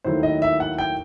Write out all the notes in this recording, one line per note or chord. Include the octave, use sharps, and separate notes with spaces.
D#2 D#3 F#3 A3 E4 C5
D#5
E5
F#5
G5